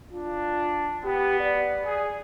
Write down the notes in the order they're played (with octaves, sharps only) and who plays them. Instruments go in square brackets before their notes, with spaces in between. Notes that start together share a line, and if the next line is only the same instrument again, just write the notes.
[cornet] D4 [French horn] F4
[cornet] B3 [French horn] G4
[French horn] D5
[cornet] G#4